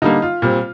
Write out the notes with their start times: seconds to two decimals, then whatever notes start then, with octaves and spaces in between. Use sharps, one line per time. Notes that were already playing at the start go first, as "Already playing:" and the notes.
0.02 D3 G3 A#3 D#4
0.22 F4
0.42 A#2 G3 C4